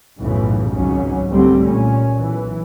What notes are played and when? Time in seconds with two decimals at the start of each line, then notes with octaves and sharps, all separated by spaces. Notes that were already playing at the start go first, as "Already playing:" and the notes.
0.18 B1 F#2 A2 C#3 E3 F3
0.73 G#1 C#2 G#2 F#3 C#4
1.30 C2 G#2 D3 G3 A3 C4
1.63 A#2 C#4
2.15 B1 E3